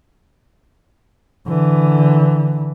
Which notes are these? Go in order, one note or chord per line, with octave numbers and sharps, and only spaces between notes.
D3 E3